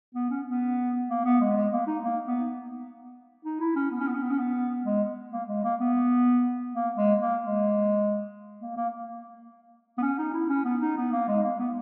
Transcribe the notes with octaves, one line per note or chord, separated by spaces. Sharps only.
B3
C#4
B3
A#3
B3
G#3
G#3
A#3
D#4
A#3
B3
D#4
E4
C#4
B3
C#4
B3
C#4
B3
C#4
B3
G#3
A#3
G#3
A#3
B3
A#3
G#3
A#3
G#3
A#3
A#3
B3
C#4
D#4
E4
C#4
B3
D#4
B3
A#3
G#3
A#3
B3